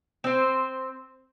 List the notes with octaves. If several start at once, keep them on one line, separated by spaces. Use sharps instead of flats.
C4 C5